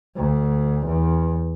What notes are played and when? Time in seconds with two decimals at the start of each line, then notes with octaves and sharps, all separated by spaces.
0.16 D2
0.86 E2